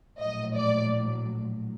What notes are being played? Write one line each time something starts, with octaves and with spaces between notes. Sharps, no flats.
A#1 A2 F#3 D#5
D5